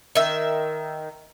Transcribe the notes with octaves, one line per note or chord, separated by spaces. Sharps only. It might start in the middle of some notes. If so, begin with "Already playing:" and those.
D#3 E5